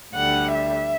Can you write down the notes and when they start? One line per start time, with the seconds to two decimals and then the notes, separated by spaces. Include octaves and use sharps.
0.15 D2 D3 G3 F#5
0.55 E5